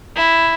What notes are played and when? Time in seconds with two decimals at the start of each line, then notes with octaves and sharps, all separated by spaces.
0.16 E4